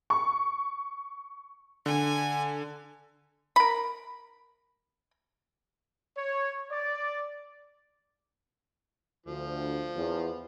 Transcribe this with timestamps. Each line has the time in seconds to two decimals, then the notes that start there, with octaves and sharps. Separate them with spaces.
0.10 C#6
1.86 D3 G#5
3.56 A#4 B5
6.16 C#5
6.70 D5
9.26 D2 F3
9.97 E2